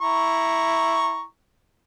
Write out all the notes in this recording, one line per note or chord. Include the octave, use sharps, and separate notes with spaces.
E4 A#5 C#6